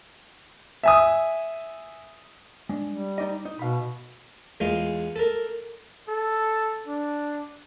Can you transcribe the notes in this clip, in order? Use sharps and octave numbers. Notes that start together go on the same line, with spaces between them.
E5 G#5 D#6
G#3 D4
G3
D#4 D5 D#5
D#4
B2 F5 B5
E2 G#3 F4
A4 A#4
A4
D4